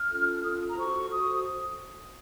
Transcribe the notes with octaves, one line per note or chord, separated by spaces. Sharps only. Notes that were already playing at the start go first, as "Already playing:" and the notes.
Already playing: F6
C#4 F4 A4
C#4 F4 A4 D#6
A#5
F#4 A4 C5 C#6
F#4 A4 C5 D#6